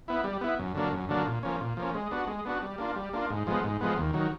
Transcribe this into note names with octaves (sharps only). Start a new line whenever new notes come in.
B3 E4
G3
B3 E4
F#2
D3 F#3 A#3 D4
F#2
D3 F#3 A#3 D4
A#2
F3 A#3 C#4
A#2
F3 A#3 C#4
G#3
B3 D4 F#4
G#3
B3 D4 F#4
G3
A#3 D4 F4
G3
A#3 D4 F4
G#2
F3 G#3 B3
G#2
F3 G#3 B3
D#2
D#3 F#3